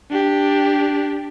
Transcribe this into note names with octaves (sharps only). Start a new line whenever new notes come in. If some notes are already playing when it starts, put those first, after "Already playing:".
D4 G4